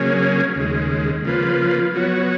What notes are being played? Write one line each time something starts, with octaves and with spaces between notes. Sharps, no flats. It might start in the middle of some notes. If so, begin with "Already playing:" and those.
Already playing: C#3 F#3 A#3 C#4 G#4
D#2 C#3 G#3
C#3 F3 A#3 F4 B4
F#3 B3 F#4 C#5